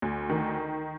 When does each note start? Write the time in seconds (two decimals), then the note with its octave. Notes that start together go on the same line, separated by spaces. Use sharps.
0.02 D2
0.30 D#3